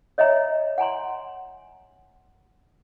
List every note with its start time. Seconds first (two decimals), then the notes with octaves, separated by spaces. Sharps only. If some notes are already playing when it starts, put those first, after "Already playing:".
0.18 C#5 D#5 E5 G5 A#5
0.78 F#5 G#5 A#5 C6